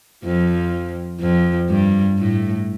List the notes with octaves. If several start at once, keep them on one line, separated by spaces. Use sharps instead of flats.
F2 F3
F2 F3
G2 G3
A2 A3